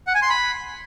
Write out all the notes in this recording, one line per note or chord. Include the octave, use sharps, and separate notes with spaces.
F#5
G#5
C6
B5